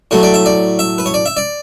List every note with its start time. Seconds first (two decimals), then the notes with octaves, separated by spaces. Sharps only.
0.11 A2 F#3 A3 C#5
0.23 D5
0.34 E5
0.46 D5
0.79 E5
0.98 B4
1.06 C#5
1.14 D5
1.26 E5
1.37 D5